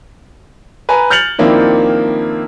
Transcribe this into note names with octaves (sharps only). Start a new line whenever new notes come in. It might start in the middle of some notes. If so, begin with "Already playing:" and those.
B4 G#5 A#5
F6 G6 A6 C#7 F7 F#7
D#3 F3 A#3 C4 D4 E4